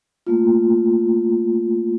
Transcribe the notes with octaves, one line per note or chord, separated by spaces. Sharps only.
A3 A#3 F4